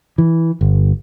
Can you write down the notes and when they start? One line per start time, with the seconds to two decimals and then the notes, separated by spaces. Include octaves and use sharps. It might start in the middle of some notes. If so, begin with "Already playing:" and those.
0.18 E3
0.61 G1